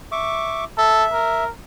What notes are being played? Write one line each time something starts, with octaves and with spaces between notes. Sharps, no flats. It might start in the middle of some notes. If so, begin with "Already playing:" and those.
E5 C#6 D6
A4 E5
A#4